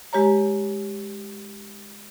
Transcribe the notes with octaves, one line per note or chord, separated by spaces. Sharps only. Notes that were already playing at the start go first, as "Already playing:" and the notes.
G#3 G4 C#5 A#5